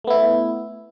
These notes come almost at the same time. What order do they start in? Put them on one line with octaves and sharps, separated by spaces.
A3 B3 E4